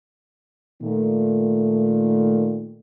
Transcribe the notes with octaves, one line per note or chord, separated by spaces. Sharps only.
A#2 D#3 A3